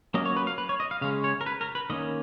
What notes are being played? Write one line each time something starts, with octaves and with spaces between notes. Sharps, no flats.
F#3 A#3 C#4 D#5
C#5
B4
F5
B4
C#5
D#5
F5
C#3 G#3 C#4 F5
C#5
A#4
B4
A#4
B4
D#3 A#3 C#4 D#5